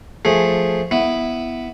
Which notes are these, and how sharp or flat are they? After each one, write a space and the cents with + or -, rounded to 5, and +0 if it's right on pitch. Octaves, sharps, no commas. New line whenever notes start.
F3 +0 A3 +0 G#4 +0
B3 +0 E4 +0